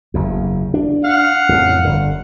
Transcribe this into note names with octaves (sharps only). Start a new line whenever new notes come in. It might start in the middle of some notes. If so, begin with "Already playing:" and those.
F#1 E2
D4
F5 F#5
F2 A2 C#3
G1 D3